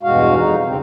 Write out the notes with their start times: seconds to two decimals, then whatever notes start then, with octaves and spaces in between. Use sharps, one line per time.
0.03 E2 G2 B2 G#3 F#4 F5
0.36 F2 D#4
0.66 C#3 C4